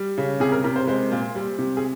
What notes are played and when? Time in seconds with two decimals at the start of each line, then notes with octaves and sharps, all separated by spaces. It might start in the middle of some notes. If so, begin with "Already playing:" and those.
Already playing: G3
0.18 C#3
0.40 C3 G#4
0.52 A#4
0.64 C3 A#4
0.76 C5
0.87 G#3 C5
1.12 A#2
1.35 G3
1.59 C3
1.77 G#4